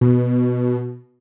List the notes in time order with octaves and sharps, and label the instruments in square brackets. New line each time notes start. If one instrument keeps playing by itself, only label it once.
[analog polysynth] B2